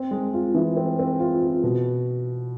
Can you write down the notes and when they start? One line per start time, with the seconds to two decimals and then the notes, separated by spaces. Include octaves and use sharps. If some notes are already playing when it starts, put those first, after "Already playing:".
Already playing: C4
0.11 G#3
0.34 F4
0.54 E3
0.77 C4
0.99 C4
1.20 F4
1.41 F4
1.64 B2